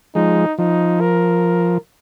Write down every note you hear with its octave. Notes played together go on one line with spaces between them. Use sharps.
F3 G#3 D#4
F3 D#4
A#4